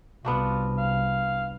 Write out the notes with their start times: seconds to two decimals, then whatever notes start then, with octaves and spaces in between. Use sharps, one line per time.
0.25 C2 B3 D4 F4 F#4
0.77 F5